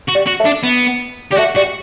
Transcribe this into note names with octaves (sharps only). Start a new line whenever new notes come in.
F#4
G3
F#4
A3
D4
B3
G3 G4
A3 F#4
G3 F#4